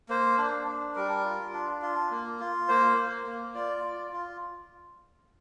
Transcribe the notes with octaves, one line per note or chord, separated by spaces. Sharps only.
A#3 C5
D4
D4
G3 A#4
F4
D4
F4
A#3
F4
A#3 C5
A#3
A#3
F4 D5
F4
F4